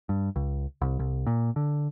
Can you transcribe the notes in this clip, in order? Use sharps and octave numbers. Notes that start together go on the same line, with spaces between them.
G2
C#2
C2
C2
A#2
D3